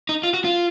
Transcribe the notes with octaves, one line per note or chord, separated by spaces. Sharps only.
D#4
F4
F#4
F4